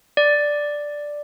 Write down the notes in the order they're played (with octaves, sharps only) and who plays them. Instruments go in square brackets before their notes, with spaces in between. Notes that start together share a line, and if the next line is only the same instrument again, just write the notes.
[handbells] D5